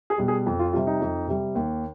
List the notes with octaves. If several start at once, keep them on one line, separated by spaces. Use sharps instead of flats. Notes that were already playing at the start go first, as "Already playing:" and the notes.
G#4
B2 G3
G#4
F2
F4
C3 G3 F4
D#4
F2
C3 G3
D#2